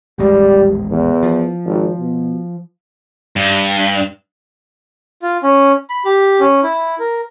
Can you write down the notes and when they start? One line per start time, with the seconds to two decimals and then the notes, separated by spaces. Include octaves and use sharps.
0.19 D#1 A1 G3 G#3
0.91 E2
1.23 F3
1.65 G#1
1.99 B2
3.36 G2
5.22 F4
5.43 C#4
5.90 B5
6.05 G4
6.40 C#4
6.63 E4
7.00 A#4